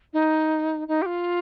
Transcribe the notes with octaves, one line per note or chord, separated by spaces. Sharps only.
D#4
D#4
G4
F4